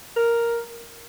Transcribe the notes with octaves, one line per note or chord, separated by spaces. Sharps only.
A#4